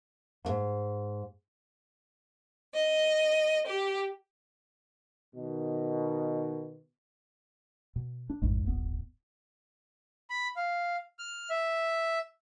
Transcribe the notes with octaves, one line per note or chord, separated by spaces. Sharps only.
E2 G#2
D#5
G4
B2 D#3
B2
D4
A1 F2 G#2
D1 G1 B3
B5
F5
F6
E5